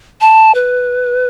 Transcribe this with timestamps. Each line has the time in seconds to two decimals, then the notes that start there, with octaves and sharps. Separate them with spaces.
0.21 A5
0.55 B4